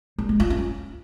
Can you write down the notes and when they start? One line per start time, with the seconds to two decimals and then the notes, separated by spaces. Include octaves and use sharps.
0.18 G3
0.29 G#3
0.40 F4
0.50 C#4